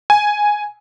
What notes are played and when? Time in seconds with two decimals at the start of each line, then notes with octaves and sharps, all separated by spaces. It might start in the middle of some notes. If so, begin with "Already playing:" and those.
0.10 G#5